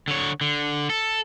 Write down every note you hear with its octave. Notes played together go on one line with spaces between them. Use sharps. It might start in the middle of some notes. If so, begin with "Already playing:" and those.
D3 C#5
D3
A4